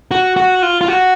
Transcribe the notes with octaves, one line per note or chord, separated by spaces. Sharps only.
F#4
F#4
F4
F4
F#4